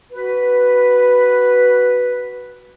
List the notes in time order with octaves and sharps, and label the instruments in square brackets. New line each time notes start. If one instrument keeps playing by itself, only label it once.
[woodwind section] F#4 B4